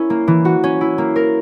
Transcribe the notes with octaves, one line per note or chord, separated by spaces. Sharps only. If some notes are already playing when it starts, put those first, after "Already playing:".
Already playing: C#4 E4 A#4
A#3
E3
F#4
C#4
E4
A#3
A#4